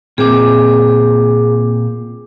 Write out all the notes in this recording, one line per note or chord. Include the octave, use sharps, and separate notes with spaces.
A#2 C4 G#4 D6